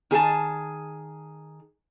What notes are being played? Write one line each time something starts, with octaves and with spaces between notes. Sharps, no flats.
D#3 G#4 A4 A5